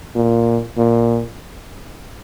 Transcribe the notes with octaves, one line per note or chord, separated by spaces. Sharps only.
A#2
A#2